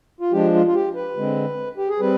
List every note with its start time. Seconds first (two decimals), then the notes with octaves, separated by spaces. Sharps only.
0.21 F4
0.32 F3 G#3 D4 G4
0.54 F4
0.67 F4
0.74 G4
0.95 B4
1.16 D3 G#3 C4
1.77 G4
1.89 G#4
2.00 G3 C4 B4